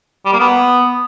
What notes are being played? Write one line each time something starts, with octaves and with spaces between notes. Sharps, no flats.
G3
A#3
B3